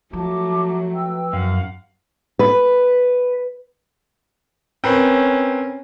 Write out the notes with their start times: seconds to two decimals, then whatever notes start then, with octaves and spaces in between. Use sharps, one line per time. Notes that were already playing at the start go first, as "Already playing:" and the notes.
0.13 F3 F#3 A3 A5 D6
0.93 B4 G5 E6
1.33 F#2 F5 F#5
2.39 B4
4.84 C4 C#4 A#4 B4